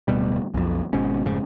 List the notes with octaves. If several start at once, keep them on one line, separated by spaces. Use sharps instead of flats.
D1 B2 G3
B1 F2
G#1 G#2 B2 C#4
F1 G#2 C#3